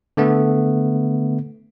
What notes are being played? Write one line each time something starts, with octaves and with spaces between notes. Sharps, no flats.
D3 A3 B3